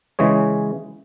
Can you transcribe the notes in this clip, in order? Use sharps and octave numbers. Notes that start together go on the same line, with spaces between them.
C#3 E3 G#3 G#4 C#5